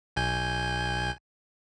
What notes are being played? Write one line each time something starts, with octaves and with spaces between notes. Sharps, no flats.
B1 G#5 G6